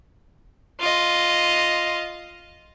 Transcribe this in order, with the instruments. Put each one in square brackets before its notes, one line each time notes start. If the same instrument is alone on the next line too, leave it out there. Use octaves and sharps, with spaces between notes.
[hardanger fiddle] F4 D#5